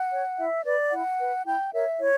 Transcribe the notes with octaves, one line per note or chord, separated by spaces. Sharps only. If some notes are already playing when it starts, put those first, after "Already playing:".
Already playing: F#5
C#5
E4 E5
B4 D5
E4 F#5
B4
E4 G5
A#4 C#5 E5
E4 C#5